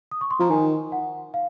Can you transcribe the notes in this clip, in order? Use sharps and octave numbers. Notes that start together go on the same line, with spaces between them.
D#6
C#6
C6
F3 A#5
D#3 G#5
F#5
F5